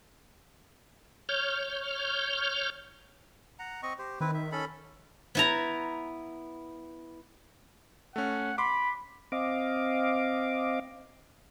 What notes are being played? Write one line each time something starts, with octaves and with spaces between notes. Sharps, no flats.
C#5 F6 G6
F#5 A#5
C4 D#5 C#6
G4 C5
D#3 C4 E4 B4
E5
C#4 A4 B5
B3 E4 A#5
A3 C#4 F#5
B5 C6 D6
C4 D#5 F5 D6